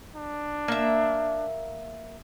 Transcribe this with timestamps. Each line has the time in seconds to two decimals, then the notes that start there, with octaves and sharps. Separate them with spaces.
0.16 D4
0.68 A#3 E5